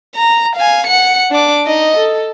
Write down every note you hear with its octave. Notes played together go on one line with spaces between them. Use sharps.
A#5
F5 G#5
F#5 C#7
D4 D6
D#4 D#5
A4